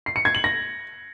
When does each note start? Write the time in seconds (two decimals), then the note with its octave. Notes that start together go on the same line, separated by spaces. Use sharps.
0.06 C7
0.16 C#7
0.25 G#6
0.35 F#7
0.44 A#6